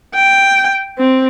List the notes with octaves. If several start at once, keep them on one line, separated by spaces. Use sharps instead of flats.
G5
C4